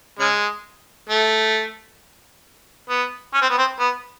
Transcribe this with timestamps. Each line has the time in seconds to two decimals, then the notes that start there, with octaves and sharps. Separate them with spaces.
0.19 C#3 G#3
1.09 A3
2.89 B3
3.34 C#4
3.42 C4
3.49 B3
3.58 C4
3.79 B3